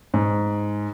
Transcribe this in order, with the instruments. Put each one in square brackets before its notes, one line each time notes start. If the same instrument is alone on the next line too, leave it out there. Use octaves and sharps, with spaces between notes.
[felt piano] G#2